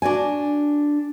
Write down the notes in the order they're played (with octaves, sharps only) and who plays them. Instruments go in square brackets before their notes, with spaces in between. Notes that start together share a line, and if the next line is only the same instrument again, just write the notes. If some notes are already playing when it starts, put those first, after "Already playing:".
[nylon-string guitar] D4 F#4 D5 G#5